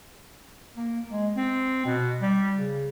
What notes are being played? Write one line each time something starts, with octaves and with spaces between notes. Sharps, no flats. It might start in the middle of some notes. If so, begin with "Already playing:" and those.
A#3
G#3
C4
B2
G3
C#3